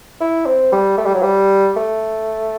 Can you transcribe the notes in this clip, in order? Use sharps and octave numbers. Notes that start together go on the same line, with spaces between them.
E4
C4
G3
A3
G3
F#3
G3
A3